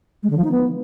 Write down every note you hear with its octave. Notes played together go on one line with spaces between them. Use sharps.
G#3
D3
F3
D#4
B3